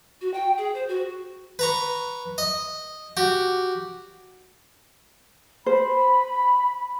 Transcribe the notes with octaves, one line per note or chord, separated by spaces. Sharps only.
F#4
G5
G#4
C5
F#4
B4 A#5 C#6
D#5
F#4 G4
C5 B5